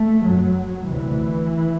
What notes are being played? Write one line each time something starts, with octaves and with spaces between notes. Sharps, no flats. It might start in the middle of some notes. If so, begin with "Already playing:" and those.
Already playing: A3
F#2 F#3
D2 C3 E3